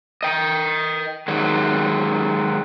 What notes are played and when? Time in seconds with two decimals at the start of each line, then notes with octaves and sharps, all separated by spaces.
0.23 D#5 G5
1.28 D#3 F#3 G#3